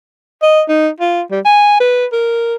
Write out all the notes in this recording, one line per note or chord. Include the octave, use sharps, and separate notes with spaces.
D#5
D#4
F4
G3
G#5
B4
A#4